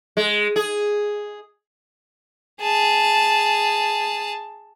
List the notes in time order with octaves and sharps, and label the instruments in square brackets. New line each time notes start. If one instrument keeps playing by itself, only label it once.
[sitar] G#3
G#4
[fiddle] G#4 A5